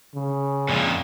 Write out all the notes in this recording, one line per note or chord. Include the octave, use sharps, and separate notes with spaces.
C#3
F2 A#2